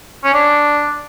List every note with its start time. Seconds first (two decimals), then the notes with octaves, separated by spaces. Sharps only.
0.24 C#4
0.34 D4